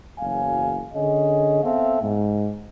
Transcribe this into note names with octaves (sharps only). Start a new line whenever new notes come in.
F#1 E2 F#3 F5 G#5
D3 C#4 G#4 D#5
B3 C4 A4 E5 F5
G#2